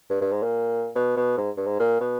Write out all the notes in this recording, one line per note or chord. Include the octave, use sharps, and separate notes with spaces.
G2
G2
G#2
A#2
B2
B2
G#2
G2
G#2
A#2
B2